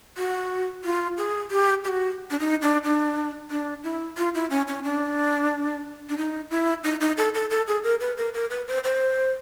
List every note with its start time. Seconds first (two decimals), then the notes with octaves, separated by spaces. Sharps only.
0.18 F#4
0.84 F4
1.17 G#4
1.51 G4
1.84 G4
1.88 F#4
2.31 D4
2.40 D#4
2.62 D4
2.84 D4
3.51 D4
3.84 E4
4.18 F4
4.35 E4
4.50 C#4
4.68 C#4
4.84 D4
6.09 D4
6.18 D#4
6.51 E4
6.84 D#4
7.01 D#4
7.18 A4
7.34 A4
7.50 A4
7.67 G#4
7.83 A#4
8.00 B4
8.17 A#4
8.34 A#4
8.50 B4
8.68 C5
8.84 C5